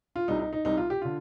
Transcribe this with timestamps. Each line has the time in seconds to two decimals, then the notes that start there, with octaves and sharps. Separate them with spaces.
0.16 F4
0.28 C2 C3 G3 D#4
0.39 D#4
0.53 D#4
0.65 C2 C3 G3 D#4
0.77 F4
0.90 G4
1.02 D3 F4